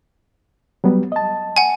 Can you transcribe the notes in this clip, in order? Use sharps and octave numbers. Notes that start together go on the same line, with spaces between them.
F#3 G3 B3
D#5 A5
F#5 G#5